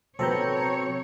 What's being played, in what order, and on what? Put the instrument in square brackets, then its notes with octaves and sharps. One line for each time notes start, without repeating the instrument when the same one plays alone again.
[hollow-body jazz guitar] C3 F#3 B3 [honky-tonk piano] C4 [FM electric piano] A4 A#5 G6 [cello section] C#5